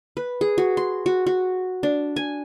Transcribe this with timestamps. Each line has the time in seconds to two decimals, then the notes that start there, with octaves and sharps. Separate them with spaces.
0.17 B4
0.41 G#4
0.58 F#4
0.77 C6
1.06 F#4
1.27 F#4
1.83 D4
2.16 G#5